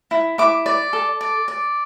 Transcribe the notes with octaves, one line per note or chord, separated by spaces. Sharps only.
E4
E4 D6
D5
A4
D5
D5